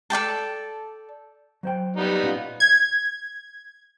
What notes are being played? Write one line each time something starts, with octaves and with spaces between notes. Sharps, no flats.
A4 D5 G5 A5
F#3 C5 G5
G3 B3 D#4
A#2 C#4 F4
G#6